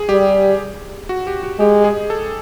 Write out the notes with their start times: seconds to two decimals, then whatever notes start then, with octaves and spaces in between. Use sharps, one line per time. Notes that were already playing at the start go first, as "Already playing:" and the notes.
Already playing: G#4
0.09 G3 G4
1.09 F#4
1.27 G4
1.43 F#4
1.59 G#3 G4
1.84 G#4
2.10 A4